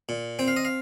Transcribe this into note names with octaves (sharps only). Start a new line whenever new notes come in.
A#2
C4 G5
F5
D#5
F5